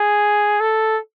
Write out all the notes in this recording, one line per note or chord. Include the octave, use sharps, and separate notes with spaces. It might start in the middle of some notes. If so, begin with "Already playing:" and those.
Already playing: G#4
A4